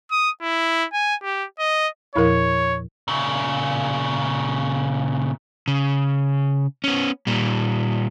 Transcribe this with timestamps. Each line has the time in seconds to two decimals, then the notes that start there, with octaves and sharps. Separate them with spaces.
0.11 D#6
0.42 E4
0.93 G#5
1.23 G4
1.59 D#5
2.16 E2 A#2 F3 E4 A#4 C#5
3.08 A#2 C#3
5.68 C#3
6.84 B3 C#4
7.27 A#2 G3